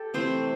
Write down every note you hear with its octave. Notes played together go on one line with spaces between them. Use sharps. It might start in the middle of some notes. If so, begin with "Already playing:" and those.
Already playing: G4 A4
C3 E3 A3 C4 C5